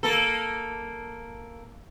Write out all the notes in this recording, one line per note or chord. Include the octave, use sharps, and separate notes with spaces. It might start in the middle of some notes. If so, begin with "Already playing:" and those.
A#3 A4